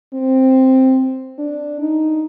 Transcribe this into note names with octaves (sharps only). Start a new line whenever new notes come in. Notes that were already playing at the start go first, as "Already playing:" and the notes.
C4
D4
D#4